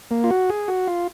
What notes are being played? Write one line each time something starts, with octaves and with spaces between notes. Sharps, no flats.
A#3
F4
F#4
G#4
F#4
F4